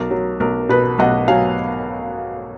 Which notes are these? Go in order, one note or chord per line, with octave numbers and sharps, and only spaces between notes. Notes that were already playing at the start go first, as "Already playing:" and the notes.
Already playing: B1 A#4
F#3
B1 A#4
B2 B4
B1 D#5 F#5
F#3 F5 G#5